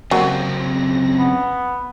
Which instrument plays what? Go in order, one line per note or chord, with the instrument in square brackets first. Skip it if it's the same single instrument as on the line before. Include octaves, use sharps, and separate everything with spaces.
[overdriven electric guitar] F#2 C4 [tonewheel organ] C#3 A#6 [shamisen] F#3 G3 A#3
[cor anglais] B3